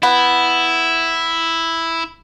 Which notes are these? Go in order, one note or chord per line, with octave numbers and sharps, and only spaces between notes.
B3 E4